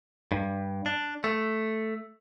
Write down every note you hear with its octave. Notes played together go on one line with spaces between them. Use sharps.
G2
D4
A3